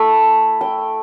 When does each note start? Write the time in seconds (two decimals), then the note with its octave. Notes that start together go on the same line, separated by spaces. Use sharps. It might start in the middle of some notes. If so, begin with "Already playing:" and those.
Already playing: A3 E4 B5
0.61 G5